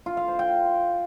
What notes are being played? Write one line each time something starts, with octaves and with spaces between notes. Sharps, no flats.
F4
F5
C5
G5